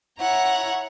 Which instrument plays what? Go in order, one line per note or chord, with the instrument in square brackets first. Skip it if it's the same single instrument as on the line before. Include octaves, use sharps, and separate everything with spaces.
[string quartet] E4 C#5 F#5 A#5